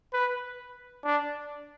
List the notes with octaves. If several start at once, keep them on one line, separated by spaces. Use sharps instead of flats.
B4
D4